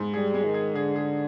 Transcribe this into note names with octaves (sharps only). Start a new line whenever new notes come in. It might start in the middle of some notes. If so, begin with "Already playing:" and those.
Already playing: G#2
G3 G#4
G#3
D#3
G#4
D3 G#4
G#4